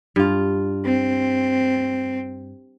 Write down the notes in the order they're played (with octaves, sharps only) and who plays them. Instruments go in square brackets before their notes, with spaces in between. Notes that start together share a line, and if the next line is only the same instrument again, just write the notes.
[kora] G2 F4
[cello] C4